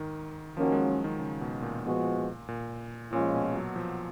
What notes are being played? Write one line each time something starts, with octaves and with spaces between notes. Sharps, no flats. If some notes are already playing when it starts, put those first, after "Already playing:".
Already playing: G#2 D#3
D#3 F3 A#3 C#4 F#4
G#3
F#3
D#3
C#3
B2
A#2
F3 G#3 B3 F#4
A#2
A#2 F3 G#3 C#4 F4
B2
F#3
F3